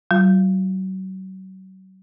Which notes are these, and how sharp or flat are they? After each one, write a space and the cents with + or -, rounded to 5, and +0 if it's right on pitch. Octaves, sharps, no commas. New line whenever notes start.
F#3 +35 F4 +10